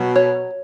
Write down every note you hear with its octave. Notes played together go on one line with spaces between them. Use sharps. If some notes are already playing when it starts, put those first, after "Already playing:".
Already playing: B2 F#3
C#5